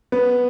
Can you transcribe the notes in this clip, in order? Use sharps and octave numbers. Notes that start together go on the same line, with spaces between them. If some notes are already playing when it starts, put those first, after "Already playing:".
B3